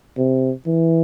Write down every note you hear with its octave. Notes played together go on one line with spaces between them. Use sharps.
C3
E3